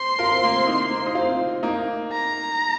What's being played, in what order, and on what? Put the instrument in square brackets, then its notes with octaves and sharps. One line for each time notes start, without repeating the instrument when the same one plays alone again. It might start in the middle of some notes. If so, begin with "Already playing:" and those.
Already playing: [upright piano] C5 [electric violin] C6
[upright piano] F4 A#4
C4
A#3
C4
A#3 D#4
A#3
C4
D#4
C4 F4
A#3 D#4
[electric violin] A#5